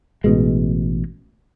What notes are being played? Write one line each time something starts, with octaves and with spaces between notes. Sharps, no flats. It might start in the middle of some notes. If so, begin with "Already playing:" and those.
A1 B2 G#3